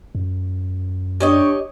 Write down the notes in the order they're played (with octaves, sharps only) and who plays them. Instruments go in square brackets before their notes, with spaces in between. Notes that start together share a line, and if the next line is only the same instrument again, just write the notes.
[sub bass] F#2
[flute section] D4 C#6 [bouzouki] G4 C#5 D#5